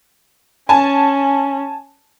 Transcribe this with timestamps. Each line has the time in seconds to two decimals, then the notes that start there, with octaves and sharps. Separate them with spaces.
0.69 C#4 G#5 A5